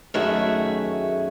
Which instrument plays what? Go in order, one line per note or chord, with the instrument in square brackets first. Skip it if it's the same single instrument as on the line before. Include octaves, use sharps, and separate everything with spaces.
[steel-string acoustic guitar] F#2 D#3 A3 F#4 G#4 E5